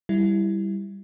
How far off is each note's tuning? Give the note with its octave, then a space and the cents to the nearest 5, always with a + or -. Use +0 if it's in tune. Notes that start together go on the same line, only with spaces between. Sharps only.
G3 +0 E4 +0